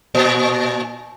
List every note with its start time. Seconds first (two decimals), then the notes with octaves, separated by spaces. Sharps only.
0.15 A#2